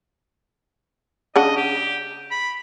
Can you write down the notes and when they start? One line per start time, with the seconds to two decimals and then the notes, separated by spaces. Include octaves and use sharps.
1.36 C#3 D4 D#5 F#5
1.57 G4
2.31 B5